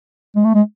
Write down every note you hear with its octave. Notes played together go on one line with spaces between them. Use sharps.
G#3
A3
G#3